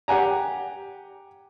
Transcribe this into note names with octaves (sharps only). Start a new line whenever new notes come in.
G4 F#5 G#5 A#5